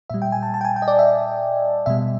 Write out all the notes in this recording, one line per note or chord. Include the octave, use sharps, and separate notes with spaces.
A#2 G3 E5
G5
G#5
A5
A5
G5
G#5
G5
D#5
D5
E5
B2 G3 E5